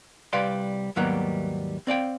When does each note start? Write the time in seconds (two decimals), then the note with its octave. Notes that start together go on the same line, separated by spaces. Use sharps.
0.33 C2 G3 B4 D5 F5 C6
0.96 D#2 G#2 F#3 G3 A#3 B3
1.87 C4 D5 F5 G5